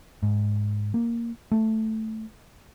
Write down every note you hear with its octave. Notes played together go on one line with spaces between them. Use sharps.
G#2
A#3
A3